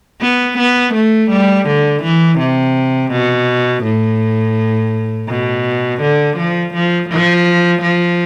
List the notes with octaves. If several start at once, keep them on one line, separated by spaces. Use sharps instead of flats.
B3
B3
A3
G3
D3
E3
C3
B2
A2
B2
D3
F3
F3
F3
F3